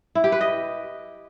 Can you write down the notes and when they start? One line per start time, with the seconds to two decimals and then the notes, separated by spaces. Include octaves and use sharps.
0.15 E4
0.24 G4
0.32 B4
0.41 D#5